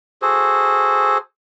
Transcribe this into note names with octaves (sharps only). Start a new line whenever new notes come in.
F#4 G#4 A4 C5